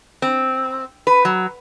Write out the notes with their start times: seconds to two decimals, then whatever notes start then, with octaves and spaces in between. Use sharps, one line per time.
0.22 C4
1.07 B4
1.25 F#3